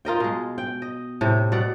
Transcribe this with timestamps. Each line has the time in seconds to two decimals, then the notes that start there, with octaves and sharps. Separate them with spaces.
0.05 F4 A#4 D#5 G5
0.20 B2 G#3
0.58 G5
0.82 D#5
1.21 A2 C3
1.52 B2 D5 F#5